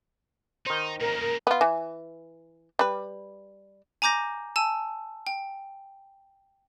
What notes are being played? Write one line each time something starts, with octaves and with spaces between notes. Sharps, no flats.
D#3 D#4 C5
A#2 C#3 A#4
B3 F4
E3
G3 B4
G#5 A#5 D6 G6 A#6
G#5 A5 E6
G5